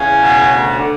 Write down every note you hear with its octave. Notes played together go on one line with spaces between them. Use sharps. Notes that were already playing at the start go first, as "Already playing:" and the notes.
Already playing: E2 C#3 C#4
B2
D2
D3